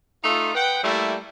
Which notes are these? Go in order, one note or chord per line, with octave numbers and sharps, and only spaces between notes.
A3 D#4 F4
B4 F#5 G5
G3 A3 A#3 E4